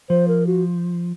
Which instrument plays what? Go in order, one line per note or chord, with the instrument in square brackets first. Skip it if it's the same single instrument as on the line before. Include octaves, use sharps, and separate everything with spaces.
[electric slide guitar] F3 [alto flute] C5
[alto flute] A#4
F#4